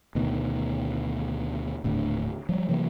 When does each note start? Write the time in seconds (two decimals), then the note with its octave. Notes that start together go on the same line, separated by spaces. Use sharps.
0.15 D2 B2 D#3
1.84 D#1 A2 D3
2.49 F3 G3
2.69 C3 E3 F#3 A#3